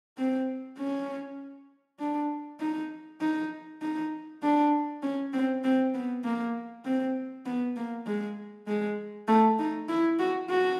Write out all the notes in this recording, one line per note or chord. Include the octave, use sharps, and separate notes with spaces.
C4
C#4
D4
D#4
D#4
D#4
D4
C#4
C4
C4
B3
A#3
C4
B3
A#3
G#3
G#3
A3
D#4
E4
F#4
F#4